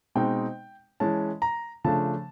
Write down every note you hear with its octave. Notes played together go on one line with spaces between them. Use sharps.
B2 G#3 C4 D#4 G5
E3 G#3 C#4 A5
A#5
C#3 F3 A3 D4 A5